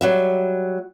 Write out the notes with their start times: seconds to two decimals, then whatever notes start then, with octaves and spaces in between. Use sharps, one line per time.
0.01 F#3 G3 E5